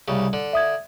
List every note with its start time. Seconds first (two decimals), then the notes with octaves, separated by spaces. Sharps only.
0.08 C2 C#3
0.33 D3
0.53 E5 D#6 G#6